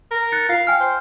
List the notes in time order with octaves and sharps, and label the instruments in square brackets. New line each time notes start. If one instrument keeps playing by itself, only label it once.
[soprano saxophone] A#4
[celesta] F#6 A6 C#7
[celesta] F4 [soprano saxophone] F5
[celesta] G5 G#5 F6
[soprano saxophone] C5